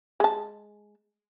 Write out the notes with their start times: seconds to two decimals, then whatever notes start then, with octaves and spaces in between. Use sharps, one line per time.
0.20 G#3 A5